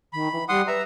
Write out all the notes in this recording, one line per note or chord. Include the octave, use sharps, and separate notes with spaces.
D#3 B5
E3
G3 F#5 C6 D#6
B4 E5 A#5